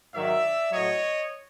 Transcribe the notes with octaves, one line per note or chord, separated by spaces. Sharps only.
G#2 D#3 F#3 D5 E5
A2 F#3 C#5 D#5